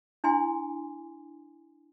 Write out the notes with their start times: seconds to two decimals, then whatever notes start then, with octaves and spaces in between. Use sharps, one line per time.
0.24 D4 E4 G#5 C6